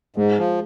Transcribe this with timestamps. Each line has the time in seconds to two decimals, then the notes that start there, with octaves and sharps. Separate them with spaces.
0.16 G#2 G#3
0.38 F3